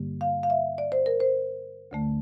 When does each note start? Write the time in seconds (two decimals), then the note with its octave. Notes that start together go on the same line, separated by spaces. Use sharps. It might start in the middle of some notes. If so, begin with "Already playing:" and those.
Already playing: G2 D3 G3 A#3
0.21 F5
0.43 F5
0.50 E5
0.78 D5
0.92 C5
1.06 A#4
1.20 C5
1.91 D2 D3 A3